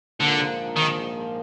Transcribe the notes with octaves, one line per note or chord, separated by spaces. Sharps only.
A#1 G#2 D3 F3 A#3
D#3